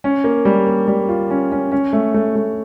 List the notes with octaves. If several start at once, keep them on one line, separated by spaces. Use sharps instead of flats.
C#4
A#3
G3
A#3
G3
F4
C#4
C#4
C#4
A3
A3
A3